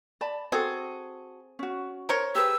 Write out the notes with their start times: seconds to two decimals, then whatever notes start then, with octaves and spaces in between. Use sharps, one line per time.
0.21 D5 A5 B5
0.52 C4 F#4 G#4 A4
1.59 C#4 F#4
2.09 A#4 C5 C#5
2.35 G4 G#4 B4 E6